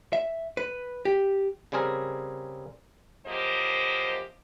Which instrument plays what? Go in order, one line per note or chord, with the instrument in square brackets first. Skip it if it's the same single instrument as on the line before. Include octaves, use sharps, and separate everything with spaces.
[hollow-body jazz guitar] E5
B4
G4
[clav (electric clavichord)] C#3 G3 C4 G#4 A#4
[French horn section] F#2 F3 A#3 G4 C5 D#5